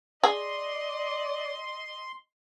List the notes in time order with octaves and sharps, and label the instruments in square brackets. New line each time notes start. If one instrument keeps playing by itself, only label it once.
[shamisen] G#4 [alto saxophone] D5 [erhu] D#5 [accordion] C6